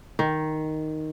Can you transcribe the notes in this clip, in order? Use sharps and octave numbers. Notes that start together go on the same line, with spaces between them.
D#3